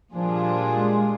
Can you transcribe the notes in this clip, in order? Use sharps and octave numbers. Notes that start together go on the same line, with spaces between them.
A#2 F3 G3 D4 F4 G#4
G#3